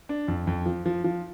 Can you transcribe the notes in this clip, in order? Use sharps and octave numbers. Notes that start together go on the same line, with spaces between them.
D4
F2
F2
F3
F3
F3